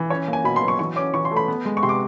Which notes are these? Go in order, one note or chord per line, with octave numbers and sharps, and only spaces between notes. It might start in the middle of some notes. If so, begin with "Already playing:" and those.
Already playing: E3
C#4 C#5
A#3
G#5
B2 B5
C6
F#3
C#6
E3 C#6
C#4 D6
E3 C#6
C6
A3
B5
B3
G#3
C#6
C3 C6
D6